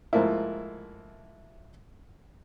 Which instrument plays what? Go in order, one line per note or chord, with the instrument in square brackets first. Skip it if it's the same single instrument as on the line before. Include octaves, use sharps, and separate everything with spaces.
[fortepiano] G#2 F3 A3 A#3 E4